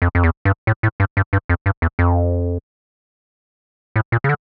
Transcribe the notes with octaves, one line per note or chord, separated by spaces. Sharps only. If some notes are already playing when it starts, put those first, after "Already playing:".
F2
F2
E2
G2
A2
A2
G2
G2
G2
F2
G2
E2
F2
A2
A#2
C#3
D3